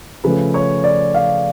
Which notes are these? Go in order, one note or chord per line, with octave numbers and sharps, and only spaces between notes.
C#3 F3 A3 B4
C#5
D5
F5